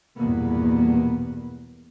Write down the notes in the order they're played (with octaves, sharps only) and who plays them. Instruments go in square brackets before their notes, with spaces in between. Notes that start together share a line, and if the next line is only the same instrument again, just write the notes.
[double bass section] A#1 E2 G2 B2 A#3 B3